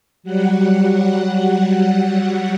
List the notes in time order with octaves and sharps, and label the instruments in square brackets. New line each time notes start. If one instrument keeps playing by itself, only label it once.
[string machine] F#3 G3 F#5